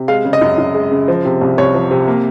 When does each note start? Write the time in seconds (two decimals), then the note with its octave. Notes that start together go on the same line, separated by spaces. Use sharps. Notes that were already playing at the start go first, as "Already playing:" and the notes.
Already playing: C3
0.08 G#3 F5
0.25 C#3
0.33 D#5
0.41 F#2
0.58 F#2
0.74 G#3
0.91 C#3
1.08 F3
1.25 C3
1.41 C2
1.58 C2 C#5
1.74 F3
1.91 C3
2.08 A#3